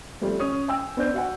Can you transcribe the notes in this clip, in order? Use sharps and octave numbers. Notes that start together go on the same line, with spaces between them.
F3 G3 A3 C4
C#4 D#6
G5 G#5 E6
B3 D4 C5 G6
F#4 F#5 G#5